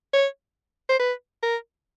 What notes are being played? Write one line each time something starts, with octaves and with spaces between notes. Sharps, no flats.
C#5
C5
B4
A#4